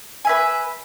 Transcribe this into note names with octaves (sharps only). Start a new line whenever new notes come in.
B4 E5 G#5